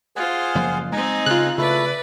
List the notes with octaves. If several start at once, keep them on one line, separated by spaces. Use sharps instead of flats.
F4 G#4 C5 F#5 G#5
F#1 F3 A#3
G#3 C4 D#4 G#5 A#5
C#3 F4 F#6
C#3 A3 E4 B4 D5